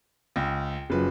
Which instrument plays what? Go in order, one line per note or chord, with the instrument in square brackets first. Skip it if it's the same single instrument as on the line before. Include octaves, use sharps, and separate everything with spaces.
[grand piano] C#2 [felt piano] G5
[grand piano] F#1 B4 [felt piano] C#3 F3 F#3